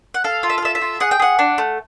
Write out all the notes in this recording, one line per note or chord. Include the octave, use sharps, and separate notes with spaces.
F#5
A4 F5
F4
E5
F5
A4 E5
E5
F4
G#4 F#5
G5
G#4 F#5
D4
A3